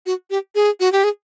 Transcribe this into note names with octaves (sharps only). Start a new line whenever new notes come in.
F#4
G4
G#4
F#4
G4
G#4